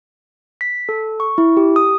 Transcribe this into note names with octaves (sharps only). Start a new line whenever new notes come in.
B6
A4
C#6
E4
G4
D#6